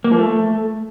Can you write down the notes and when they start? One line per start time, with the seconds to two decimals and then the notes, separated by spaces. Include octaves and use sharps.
0.04 A#3
0.11 F3
0.18 A3